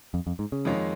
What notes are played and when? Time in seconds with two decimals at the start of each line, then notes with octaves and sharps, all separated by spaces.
0.14 F2
0.27 F2
0.39 G#2
0.52 C#3
0.65 F2 D#3 G#3 F4 C#5